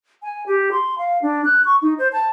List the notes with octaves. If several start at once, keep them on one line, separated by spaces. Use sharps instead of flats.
G#5
G4
C6
F5
D4
F#6
C#6
D#4
C5
A5